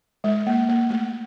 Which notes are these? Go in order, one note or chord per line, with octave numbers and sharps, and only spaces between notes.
G#3
A#3
A#3
A3